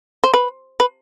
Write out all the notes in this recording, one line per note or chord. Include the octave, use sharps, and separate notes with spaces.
C5
B4
B4